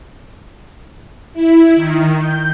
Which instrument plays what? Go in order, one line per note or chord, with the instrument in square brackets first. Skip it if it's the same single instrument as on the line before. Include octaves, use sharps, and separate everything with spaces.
[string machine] E4
D#3
G6